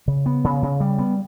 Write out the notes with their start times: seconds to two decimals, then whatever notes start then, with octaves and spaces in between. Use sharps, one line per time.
0.08 C#3
0.26 B3
0.44 C#3
0.62 C#3
0.80 G3
0.99 B3